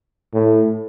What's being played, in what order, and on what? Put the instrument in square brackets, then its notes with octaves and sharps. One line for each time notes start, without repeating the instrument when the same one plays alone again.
[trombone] A2